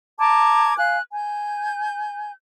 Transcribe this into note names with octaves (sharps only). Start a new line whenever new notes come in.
A5 A#5 D6 G#6
F5 G#5 F#6
G#5 G6